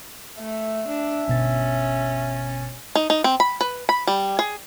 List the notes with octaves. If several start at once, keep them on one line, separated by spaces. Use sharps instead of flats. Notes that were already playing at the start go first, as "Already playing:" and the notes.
A3 E5
D4
G1 B2 C#4 A6
D#4
D#4
C4
B5
B4
B5
G3
G#4